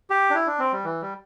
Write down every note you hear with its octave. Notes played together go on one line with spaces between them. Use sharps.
G4
D4
E4
D4
C4
G3
E3
G3